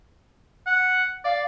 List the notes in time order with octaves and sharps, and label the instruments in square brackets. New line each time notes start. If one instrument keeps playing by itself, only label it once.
[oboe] F#5
[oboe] D5 [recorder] F5